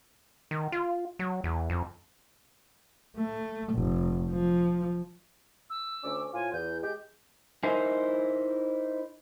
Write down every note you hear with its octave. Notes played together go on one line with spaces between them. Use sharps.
D#3
F4
F#3
E2
F2
A3
F1
F3
E6
D2 C#4 D6
A2 F4 C5 G#5
E2 G6
G#3 G4 G6
D#4 E4 A#4 C5 G#5